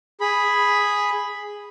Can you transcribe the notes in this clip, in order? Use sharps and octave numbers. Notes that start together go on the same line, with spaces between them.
G#4 B5